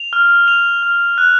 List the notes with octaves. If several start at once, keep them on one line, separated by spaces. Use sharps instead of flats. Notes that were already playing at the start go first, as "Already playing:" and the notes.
Already playing: F7
F6
F7
F6
F#6